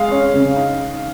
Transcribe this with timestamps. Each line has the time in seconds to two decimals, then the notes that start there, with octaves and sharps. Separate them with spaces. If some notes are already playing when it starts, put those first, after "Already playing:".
Already playing: G#3 F5
0.11 C#4
0.34 C#3
0.56 D#4